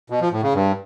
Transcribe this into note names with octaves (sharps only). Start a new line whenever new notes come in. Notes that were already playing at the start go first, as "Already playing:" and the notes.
B2
F3
A2
C#3
G2